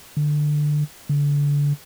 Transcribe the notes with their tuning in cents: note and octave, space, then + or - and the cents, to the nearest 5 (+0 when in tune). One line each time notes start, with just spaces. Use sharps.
D3 +15
D3 -30